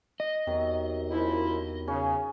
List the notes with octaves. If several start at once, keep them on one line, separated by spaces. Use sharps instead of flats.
D#5
E2 C3 D#3 F#3
F#2 F3 E4
C#3 C#4 G#4